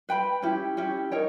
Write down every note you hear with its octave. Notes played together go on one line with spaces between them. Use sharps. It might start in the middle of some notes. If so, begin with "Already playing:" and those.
B4 G5 B5
C#4 E4 G4
C#4 E4 G4
D#4 A#4 C#5 G5